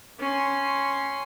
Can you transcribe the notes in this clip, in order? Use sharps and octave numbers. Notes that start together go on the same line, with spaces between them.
C#4 C6